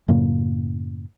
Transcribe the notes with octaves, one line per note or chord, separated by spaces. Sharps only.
F#2 A2 C#3 A#3